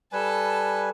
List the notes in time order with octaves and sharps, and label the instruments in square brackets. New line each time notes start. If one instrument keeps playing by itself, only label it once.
[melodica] G3 B4 G#5 [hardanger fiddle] A4 A5